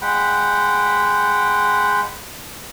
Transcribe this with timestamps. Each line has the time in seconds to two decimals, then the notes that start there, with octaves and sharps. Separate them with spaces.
0.02 G#3 F#5 G5 B5